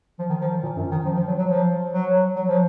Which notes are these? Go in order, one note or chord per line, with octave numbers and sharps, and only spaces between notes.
F3
D#3
F3
D#3
A#2
F#2
D#3
F3
F3
F#3
F#3
F3
F#3
F#3
F3